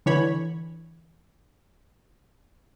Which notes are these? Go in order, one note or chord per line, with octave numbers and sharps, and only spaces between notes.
D3 E3 C#5 B5 G#6